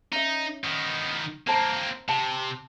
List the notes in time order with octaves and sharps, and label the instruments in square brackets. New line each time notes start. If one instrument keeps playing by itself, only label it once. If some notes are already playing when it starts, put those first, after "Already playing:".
[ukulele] C#4 E5 [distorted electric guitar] D#4
[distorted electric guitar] D#3 B3
[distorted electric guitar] A#3 C4 [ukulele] C5 A5 A#5
[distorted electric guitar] C3 [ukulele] A5